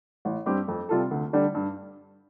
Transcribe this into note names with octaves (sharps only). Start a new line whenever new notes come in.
A1
G2 G3 C4 G4
F2
C3 G3 F4 A4
D2
D3 G3 D4
G2